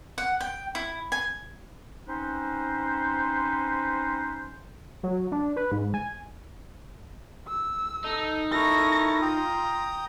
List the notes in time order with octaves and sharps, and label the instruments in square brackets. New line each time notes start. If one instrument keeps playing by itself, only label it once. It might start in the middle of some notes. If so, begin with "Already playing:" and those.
[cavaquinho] F#5
G5
E4
G#5
[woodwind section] C4 C#4 D#4 B4 C5
[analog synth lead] F#3
D4
B4
G#2
G#5
[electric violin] E6
[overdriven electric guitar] D#4 [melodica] A4
[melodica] E4 A4 A#4 [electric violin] C#6 A#6
[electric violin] F4 [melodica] G5 A#5 D#6